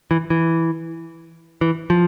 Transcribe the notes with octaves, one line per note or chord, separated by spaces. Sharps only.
E3
E3
E3
F3